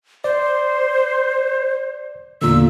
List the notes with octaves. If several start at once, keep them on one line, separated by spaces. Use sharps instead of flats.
C5 D5
E2 A#2 D3 E6